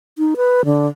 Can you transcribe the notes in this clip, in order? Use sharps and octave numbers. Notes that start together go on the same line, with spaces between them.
D#4
B4
D3